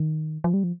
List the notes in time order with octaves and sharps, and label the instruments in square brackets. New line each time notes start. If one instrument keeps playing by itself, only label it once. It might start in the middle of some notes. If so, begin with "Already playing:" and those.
Already playing: [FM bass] D#3
F3
G3
F3